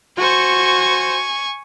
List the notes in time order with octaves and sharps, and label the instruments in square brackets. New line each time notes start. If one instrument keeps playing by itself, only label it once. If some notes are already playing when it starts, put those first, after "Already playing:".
[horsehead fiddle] F#4 C5 [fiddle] G#5 C#6